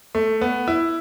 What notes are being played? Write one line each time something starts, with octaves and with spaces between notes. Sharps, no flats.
A3
B3
E4